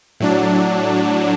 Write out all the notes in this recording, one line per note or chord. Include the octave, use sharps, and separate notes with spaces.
A2 F#3 D4